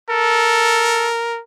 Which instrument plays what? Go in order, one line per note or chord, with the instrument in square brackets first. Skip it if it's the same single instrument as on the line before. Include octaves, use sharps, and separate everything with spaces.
[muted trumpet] A4 [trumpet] A#4